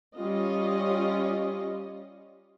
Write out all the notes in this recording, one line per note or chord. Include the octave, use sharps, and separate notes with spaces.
G3 C#4 F4 D#5